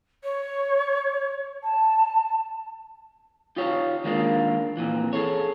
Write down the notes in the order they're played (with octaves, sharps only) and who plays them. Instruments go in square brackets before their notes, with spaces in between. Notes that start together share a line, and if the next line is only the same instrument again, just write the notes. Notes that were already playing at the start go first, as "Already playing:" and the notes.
[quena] C#5
A5
[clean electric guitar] D#4 F4 G4 C#5
D#3 G#3 A#3 D4 F4
F2 A#2 E3
G#4 A4 C#5